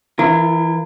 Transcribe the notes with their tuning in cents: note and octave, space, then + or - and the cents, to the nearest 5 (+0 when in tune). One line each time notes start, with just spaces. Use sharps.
E3 +0 F4 -40 A#4 -20